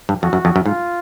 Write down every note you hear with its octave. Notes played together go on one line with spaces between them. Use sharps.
G2
F2 F#4
F#2
F2
F#2
G#2 F4